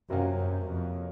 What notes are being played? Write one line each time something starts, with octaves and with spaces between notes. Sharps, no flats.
F#2 C3 F#3 A#3 C#4 F4
F#2
F2